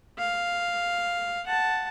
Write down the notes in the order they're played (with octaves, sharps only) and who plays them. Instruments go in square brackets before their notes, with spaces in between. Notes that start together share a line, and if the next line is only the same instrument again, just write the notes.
[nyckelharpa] F5
F#5 A5